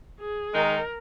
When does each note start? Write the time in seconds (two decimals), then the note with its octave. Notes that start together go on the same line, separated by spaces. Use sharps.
0.20 G#4
0.54 D#3 G#3 D#4 A#4